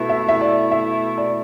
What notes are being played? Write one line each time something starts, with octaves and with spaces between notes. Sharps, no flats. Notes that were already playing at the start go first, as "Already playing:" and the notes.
Already playing: B2 A3 E4
E5
E5
D5
E5
D5